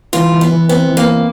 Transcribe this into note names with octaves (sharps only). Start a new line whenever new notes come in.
E3 F4
E3
B3
E3
B3 C4
E3
A#3
C4